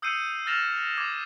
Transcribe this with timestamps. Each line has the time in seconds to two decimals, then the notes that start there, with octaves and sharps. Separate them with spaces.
0.02 D#6 E6 G6 C7 C#7 D#7
0.46 E6 F6 A6 A#6 E7 F7
0.98 D6 G#6 F7